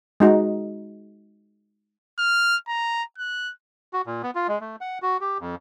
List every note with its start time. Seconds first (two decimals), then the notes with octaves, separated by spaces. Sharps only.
0.20 G#3 D#4 F#4
2.19 F6
2.68 A#5
3.18 F#6
3.93 F#4
4.06 A#2
4.23 B3
4.35 F4
4.48 G#3
4.61 A3
4.81 F#5
5.02 F#4
5.21 G4
5.40 F2